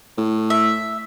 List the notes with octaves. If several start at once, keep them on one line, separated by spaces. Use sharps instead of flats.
A2
E5